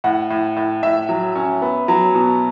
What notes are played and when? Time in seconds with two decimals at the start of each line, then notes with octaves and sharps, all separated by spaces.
0.04 A2 F#5
0.30 A2
0.57 A2
0.83 A2 E5
1.09 F#3
1.35 C#4
1.62 B3
1.88 F#3
2.14 B2